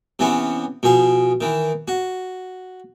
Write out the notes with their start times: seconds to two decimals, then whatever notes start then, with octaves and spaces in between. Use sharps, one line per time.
0.19 C3 E3 B3 C#4
0.83 B2 F3 G#4
1.41 D#3 E3
1.88 F#4